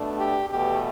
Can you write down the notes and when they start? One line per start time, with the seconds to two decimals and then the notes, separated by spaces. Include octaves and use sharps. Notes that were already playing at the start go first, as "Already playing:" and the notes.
Already playing: B2 A3 D4
0.18 G4
0.49 E2 B2 A3 G4